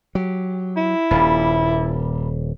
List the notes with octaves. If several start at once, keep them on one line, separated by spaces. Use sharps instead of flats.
F#3 G4
E4
D#1 G2 A#2 G3